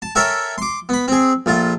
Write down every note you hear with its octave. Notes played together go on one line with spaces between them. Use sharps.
A5
A4 A#4 C#5 E5 G5 G#5
C6 D6
B3 B5
C4 G#4
A#1 A3 F4